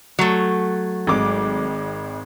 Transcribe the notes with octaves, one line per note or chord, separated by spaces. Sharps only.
F#3 A3
G#1 G#3 D6